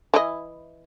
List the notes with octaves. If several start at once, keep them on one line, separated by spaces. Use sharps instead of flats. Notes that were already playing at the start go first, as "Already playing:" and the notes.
E3 E4 D#5